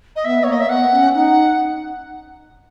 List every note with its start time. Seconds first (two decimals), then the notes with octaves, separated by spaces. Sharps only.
0.16 D#5
0.24 B3 E5
0.43 B3 C#5
0.47 A#3 D#5
0.60 E5
0.69 B3 F#5
0.91 C#4
1.13 D#4 F#5